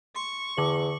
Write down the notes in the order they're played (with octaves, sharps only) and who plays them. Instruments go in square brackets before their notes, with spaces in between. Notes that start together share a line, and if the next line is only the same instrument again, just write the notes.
[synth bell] C6 [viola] C#6
[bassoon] E2 [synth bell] D3 F#7